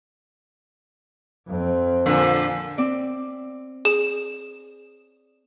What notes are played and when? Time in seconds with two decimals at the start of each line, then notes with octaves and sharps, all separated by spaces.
1.47 F2 C4
2.06 A#2 D3 F3
2.78 C4 D5
3.85 G#4 E7